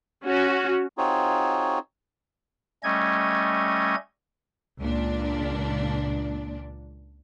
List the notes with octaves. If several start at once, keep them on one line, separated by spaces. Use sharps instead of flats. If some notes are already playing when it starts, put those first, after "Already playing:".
C#4 F#4
C4 D#4 F4 F#4 G#4 C#5
G3 A3 C#4 D#5 G#6
C#2 A#2 D4